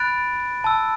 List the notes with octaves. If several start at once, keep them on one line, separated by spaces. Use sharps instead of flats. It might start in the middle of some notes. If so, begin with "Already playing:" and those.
Already playing: B5 F#6 A6 D7
A5 E6